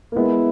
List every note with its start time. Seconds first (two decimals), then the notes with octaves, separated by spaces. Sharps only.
0.12 A#3
0.16 G#3 B3 E4